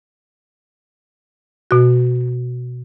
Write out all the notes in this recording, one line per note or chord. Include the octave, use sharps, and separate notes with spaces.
B2 F#4